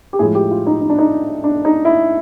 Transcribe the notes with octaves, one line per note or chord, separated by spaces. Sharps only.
G4
A2 F3 G#3 G#4
G4
F4
D#4
D#4
D4
D#4
D4
D#4
E4